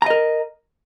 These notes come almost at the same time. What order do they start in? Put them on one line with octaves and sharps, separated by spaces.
A#5 D#5 A#4